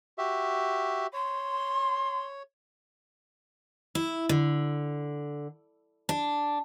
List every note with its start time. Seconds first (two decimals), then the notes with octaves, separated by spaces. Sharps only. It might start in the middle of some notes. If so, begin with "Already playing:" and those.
0.18 F#4 G4 E5
1.13 C#5 C6
3.95 E4
4.29 D3
6.09 D4